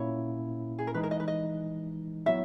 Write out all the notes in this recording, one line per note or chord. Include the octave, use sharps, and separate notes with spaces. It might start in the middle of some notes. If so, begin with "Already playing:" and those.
Already playing: A#2 A#3 C#4 E4 C#5
G#4
A#4
E3 G#3 D#4 B4
A#4
D#5
B4
D#5
F#3 B3 E4 E5